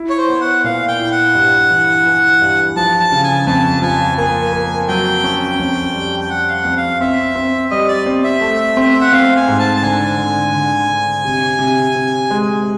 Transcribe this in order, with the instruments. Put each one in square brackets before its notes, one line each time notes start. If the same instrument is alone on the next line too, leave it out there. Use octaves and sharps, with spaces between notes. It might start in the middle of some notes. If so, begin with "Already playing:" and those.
Already playing: [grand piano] E4
[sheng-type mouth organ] C#5
C5
[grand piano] B3
[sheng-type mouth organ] F#5
[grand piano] A#2 [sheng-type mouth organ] F5
[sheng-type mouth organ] G5
[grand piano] E4
[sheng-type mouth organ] F#5
[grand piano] G2
E3
E3
G2
[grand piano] F3 [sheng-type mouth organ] A5
[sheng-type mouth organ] A5
[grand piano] C#3
[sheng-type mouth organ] G#5
[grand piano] F2 [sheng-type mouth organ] A5
[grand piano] F3 [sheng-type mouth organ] G#5
[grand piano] A#3 [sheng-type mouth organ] G#5
[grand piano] A#3
[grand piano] F#3 [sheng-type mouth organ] G5
[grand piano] C#4
F2
G3
[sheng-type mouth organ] G5
[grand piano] G3 [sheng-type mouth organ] F#5
[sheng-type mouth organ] F5
F#5
[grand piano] F2
[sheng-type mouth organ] F5
[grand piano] C4 [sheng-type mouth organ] E5
[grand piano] C4
[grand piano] G3 [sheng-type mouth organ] D#5
[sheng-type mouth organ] D5
[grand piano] C4
[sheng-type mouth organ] E5
[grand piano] A3
C4
[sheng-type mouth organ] F#5
[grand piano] C4 [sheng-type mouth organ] F5
[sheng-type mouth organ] G#5
[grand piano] G#2
[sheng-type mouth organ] A5
A5
[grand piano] D3 [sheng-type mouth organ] G#5
[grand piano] D3
D3
D3
C3
C3
C3
G#3